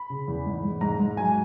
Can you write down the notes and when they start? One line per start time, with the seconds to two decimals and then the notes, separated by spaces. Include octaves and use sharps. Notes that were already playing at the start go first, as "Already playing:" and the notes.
Already playing: B5
0.10 C#3
0.28 E2
0.46 G#2
0.64 G#2
0.81 G#2 A#5
1.00 G#2
1.17 F#3 G#5